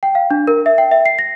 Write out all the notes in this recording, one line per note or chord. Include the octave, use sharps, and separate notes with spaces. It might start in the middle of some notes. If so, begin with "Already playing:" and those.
G5
F5
D4
A#4
E5
G5
E5
C7
A#6